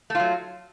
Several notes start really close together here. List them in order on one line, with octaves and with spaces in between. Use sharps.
A3 F4 F#3